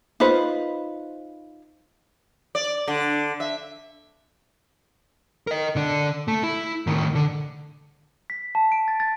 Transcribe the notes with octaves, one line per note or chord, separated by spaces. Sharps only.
D#4 F4 B4 C5
D5
D3
E5
A#4 D#5
D3 D4
A3
E4
A2 D#3
D3
B6
A5
D7
A6
A6